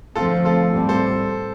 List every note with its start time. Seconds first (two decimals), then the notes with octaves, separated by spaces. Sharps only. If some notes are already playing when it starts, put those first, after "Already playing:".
0.15 F2 D3 F3 A3 C4 F4 A4
0.45 F4 A4
0.74 A2 G3 C4
0.89 A4 C5